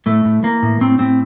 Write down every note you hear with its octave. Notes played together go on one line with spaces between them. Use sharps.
A2 A3
A2
E3 A#3
A2
A2 C4
A2 C4